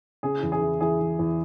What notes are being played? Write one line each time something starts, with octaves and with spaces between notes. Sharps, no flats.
C#3 G#4
E2
G#4
E3
E3 G#4
E3
E2